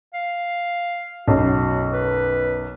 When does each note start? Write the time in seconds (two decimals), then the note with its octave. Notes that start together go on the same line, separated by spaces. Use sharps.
0.14 F5
1.28 B1 F#2 F#4
1.93 B4